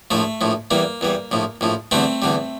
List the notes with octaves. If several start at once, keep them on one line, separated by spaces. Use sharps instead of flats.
A#1 A2 F3 A3
A#1 A2 F3
E2 E3 G3 A#3
E2 E3 G3
A#1 A2 F3
A#1 A2 F3
E2 D3 G3 A3 C4
E2 D3 G3